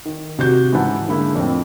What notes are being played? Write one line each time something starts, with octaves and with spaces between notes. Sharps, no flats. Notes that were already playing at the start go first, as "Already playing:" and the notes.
D#3
C3 F#4 G6
G#2 C#3 E3 E4 F#5 A5
D3 G#3 A#3 E4
F2 A2 C4